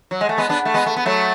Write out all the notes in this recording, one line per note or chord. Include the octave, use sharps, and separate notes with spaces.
F#3
G#3
A3
G#3 B3
B3 D4
A3
G#3 B3
A3
B3
F#3 A3